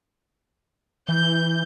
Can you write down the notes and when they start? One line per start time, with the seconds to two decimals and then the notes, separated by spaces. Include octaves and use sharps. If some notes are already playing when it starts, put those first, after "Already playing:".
1.09 E3 G6